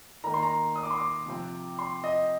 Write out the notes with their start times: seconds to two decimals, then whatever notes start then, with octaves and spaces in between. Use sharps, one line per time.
0.24 D#3 A#3 A#5
0.34 C6
0.43 A#5
0.76 D#6
0.83 D6
0.90 C6
0.98 D6
1.26 C3 F3 C4
1.79 C6
2.04 D#5